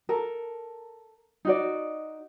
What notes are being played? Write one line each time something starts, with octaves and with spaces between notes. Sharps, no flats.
A4 A#4
D#4 F#4 D5